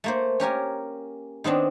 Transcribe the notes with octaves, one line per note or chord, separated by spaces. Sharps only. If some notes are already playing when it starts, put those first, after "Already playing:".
A3 A#3 C5
C#4 G4 A#4 G#5
D#3 B3 C4 D4